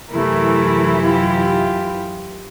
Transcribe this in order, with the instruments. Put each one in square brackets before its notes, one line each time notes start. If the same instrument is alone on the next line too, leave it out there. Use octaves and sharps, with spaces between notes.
[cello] F#2 [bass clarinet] C3 [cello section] E3 E4 [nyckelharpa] A3 A#4
[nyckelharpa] F4 G4